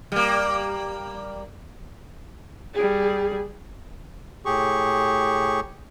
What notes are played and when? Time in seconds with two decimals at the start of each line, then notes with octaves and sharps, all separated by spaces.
0.12 G3 A#3
2.75 G3 G#4
4.45 A2 G4 G#4 C#6